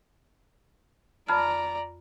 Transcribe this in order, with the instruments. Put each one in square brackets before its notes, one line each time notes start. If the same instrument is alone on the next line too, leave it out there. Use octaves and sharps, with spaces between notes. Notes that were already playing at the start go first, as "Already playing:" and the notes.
[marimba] F2 B5 F6 [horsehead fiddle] D5 A#5